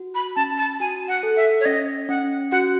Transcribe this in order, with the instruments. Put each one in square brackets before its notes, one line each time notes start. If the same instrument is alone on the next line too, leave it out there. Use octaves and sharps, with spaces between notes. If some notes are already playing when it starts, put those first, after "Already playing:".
Already playing: [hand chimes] F#4
[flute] B5
[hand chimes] C#4 [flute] A5
[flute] A5
[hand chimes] F#4 [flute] G#5
[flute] F#5
[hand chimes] A4
[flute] E5
C#5
[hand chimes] C#4 [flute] D#5
[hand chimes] C#4 [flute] F#5
[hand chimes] F#4 [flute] F#5